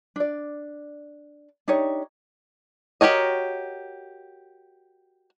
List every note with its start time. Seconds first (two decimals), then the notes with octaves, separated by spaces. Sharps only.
0.16 D4 D5
1.68 D4 D#4 G4 C#5
3.01 F#4 G4 A#4 C#5 D#5